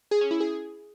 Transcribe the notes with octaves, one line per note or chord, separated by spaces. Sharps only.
G#4
C#4
E4
G#4